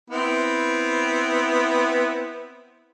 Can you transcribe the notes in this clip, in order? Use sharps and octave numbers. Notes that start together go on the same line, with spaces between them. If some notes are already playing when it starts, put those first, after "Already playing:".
B3 C4 E4